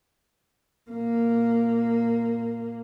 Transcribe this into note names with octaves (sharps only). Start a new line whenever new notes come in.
A#2 A#3